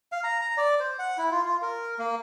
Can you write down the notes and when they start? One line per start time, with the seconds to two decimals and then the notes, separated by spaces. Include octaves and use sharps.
0.12 F5
0.24 A#5
0.41 A#5
0.57 D5
0.80 C5
0.99 F#5
1.18 E4
1.31 F4
1.45 F4
1.62 A#4
1.99 A#3